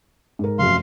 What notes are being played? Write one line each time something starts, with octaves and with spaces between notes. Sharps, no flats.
G#2 A#4
F1 F#2 F5 C6